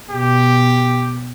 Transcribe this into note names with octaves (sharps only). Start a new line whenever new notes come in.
B2 G4